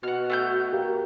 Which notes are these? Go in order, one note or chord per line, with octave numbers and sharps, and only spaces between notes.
B2 F#4 F#5 F6
A3 F#5 G6
A#3 G4